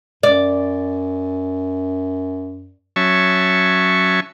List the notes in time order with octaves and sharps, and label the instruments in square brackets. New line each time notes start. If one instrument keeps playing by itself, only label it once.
[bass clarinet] F#2 [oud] D5
[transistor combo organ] F#3 C#4 E5 A5 C#6